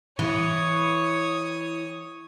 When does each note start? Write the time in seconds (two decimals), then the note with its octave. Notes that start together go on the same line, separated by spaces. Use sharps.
0.19 E3 C#5 D#6